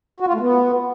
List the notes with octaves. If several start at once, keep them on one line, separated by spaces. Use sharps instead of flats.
F#4
F4
A3
B3